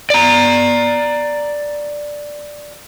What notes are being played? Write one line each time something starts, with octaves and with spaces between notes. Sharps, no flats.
D5 A#5